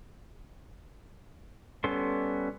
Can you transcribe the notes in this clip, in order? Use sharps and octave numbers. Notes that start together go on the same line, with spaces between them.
G3 B3 C#4 A4 C6